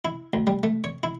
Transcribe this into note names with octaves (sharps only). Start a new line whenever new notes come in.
E4
D2
G3
A3
C#5
E4